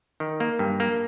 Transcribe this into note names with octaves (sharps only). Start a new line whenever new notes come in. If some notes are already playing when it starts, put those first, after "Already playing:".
D#3
A#3
G2
A#3